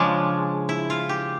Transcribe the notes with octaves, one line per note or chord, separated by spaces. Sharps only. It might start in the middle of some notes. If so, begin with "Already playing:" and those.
Already playing: C#3 F3 G#3 D4
E4
F4
G4